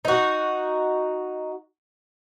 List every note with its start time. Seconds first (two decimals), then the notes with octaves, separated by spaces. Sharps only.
0.05 D#4 F#4